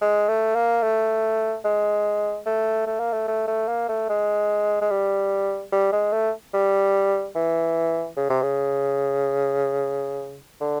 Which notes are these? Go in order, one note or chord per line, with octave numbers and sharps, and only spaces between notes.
G#3
A3
A#3
A3
G#3
A3
A3
A#3
A3
A3
A3
A#3
A3
G#3
G#3
G3
G3
G#3
A3
G3
E3
C#3
C3
C#3
D3